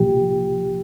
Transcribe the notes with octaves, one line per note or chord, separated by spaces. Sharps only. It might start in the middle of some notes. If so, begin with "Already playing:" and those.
Already playing: C2 A#2 F3 G4